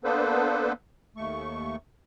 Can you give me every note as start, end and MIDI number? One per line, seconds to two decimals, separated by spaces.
0.04 0.72 58
0.04 0.72 59
0.04 0.72 62
0.04 0.72 69
0.04 0.72 71
0.04 0.72 72
1.17 1.76 39
1.17 1.76 57
1.17 1.76 85